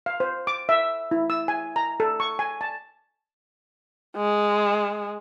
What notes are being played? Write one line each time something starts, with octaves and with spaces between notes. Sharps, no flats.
F5
C5
D6
E5
E4
E6
G#5
A#5
A4
C#6
G#5
A5
G#3